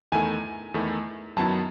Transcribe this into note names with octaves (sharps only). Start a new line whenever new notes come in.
E2 D#3 A3 E4 A4 G#5
E2 D#3 A3 E4 A4
F#2 D#3 F#3 B3 E4 A5